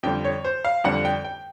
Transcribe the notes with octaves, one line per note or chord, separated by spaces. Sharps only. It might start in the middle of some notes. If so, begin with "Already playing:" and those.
F2 D3 G3 G5
C#5
C5
F5
F2 D3 G3 F#5
G5
G5